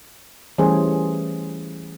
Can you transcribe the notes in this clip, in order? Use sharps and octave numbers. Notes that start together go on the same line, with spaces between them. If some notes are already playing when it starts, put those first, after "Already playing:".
E3 G3 A3 C#4 G#4 C5